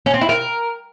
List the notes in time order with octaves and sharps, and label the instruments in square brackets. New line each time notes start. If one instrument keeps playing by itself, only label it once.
[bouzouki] C#4
C4
E4
A#4